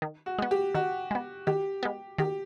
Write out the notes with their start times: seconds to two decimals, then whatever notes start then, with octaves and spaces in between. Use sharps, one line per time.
0.02 D#3
0.26 F#4
0.38 G#3 B3
0.51 G4
0.75 D#3 F#4
1.11 G#3 B3
1.47 D#3 G4
1.83 G#3 B3
2.18 D#3 G4